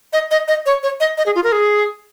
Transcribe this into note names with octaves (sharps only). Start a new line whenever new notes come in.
D#5
D#5
D#5
C#5
C#5
D#5
D#5
G#4
F4
A#4
G#4